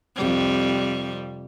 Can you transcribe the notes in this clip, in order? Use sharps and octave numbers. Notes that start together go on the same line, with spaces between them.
F2 C3 G3